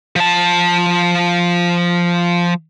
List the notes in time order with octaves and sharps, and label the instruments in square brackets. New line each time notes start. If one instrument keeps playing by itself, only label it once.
[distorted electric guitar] F3 A5